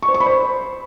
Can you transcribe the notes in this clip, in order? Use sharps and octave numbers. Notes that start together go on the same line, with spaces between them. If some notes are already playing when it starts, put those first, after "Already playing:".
C#6
C5
C#6
B5
C5